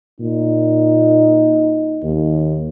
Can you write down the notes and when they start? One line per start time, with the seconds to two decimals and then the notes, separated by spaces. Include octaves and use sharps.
0.20 A#2 D#4
2.03 D#2